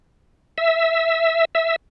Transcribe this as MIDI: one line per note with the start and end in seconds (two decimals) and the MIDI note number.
0.58 1.45 76
1.55 1.76 76